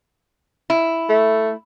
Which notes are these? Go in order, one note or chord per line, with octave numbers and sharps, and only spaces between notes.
E4
A3